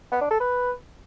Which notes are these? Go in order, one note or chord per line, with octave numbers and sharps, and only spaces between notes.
B3
D4
A4
B4